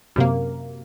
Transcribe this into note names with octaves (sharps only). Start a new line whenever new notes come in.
F#2 C3 A#3